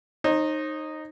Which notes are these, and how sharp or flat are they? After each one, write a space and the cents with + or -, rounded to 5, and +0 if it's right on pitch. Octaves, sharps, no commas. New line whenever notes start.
D#4 -10 C5 +45